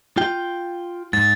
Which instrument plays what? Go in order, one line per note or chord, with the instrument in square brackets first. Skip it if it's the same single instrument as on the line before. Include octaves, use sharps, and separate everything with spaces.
[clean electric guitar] F4 G5
[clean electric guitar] G#2 [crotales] A6